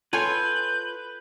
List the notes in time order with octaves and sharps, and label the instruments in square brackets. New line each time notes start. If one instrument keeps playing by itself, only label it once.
[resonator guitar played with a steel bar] F4 C#5 G#5 [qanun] A4 [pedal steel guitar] B4 [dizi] G6